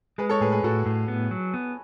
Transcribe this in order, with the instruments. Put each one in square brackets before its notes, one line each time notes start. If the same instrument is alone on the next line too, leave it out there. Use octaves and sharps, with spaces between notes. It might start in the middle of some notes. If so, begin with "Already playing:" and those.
[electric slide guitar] G#3 [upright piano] G#4 B4
[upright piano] A4 C#5
[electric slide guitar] A2 [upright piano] G#4 B4
[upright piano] G#4 B4
[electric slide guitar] A2 [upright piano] F#4 A4
[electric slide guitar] A2
B3
F#3
B3